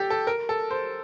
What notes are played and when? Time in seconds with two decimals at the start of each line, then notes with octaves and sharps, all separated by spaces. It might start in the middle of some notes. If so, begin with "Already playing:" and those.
Already playing: G4 A4
0.10 A4
0.27 A#4
0.49 A4
0.71 C5